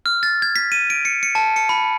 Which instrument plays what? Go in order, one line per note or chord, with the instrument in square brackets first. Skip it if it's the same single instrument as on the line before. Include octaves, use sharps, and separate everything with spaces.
[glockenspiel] F6
A6
G#6
B6
D#7
D7
C#7
C#7
A5
C#7
B5